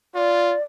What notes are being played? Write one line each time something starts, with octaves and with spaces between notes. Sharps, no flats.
F4 D5